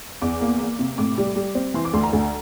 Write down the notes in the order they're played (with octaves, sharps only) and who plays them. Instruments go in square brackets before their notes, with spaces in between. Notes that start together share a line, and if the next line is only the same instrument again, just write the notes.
[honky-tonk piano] E2 D6
A#3
A#3
C3
A2 D6
G3
G3
C4
E3 C6
D6
D2 C6
A#5
D2